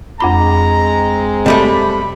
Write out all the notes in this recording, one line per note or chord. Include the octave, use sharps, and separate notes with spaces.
F2 G#3 C4 F4 A#5 B5
C3 G3 A3 D#5 B5